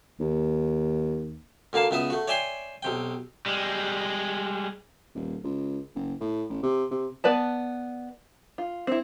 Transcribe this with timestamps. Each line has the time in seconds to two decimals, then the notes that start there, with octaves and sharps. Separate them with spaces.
0.20 D#2
1.73 D2 D3 A#3 F5 A5
1.91 C#2 B3 E5 D#6
2.10 A3 F#4
2.28 C#5 D5 E5 G5 G#5 C6
2.83 B1 C3 G5
3.46 G3 G#3
5.15 D#1
5.44 C#2
5.95 F#1
6.21 A2
6.50 A1
6.63 C3
6.91 C3
7.24 B3 B4 D5 A5
8.58 F4
8.87 C4 E4